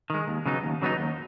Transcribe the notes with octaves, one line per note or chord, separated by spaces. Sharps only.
D#3 G#3
D#2
C#3 F#3 B3 D#4
D#2
C#3 F#3 B3 D#4
D#2